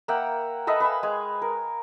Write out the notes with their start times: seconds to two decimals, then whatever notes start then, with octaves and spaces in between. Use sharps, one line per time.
0.08 A#3 E5 F#5 G5
0.67 A4 B4 D#5 E5
0.80 B4 F5 G#5 E6
1.03 G#3 G#5
1.42 A#4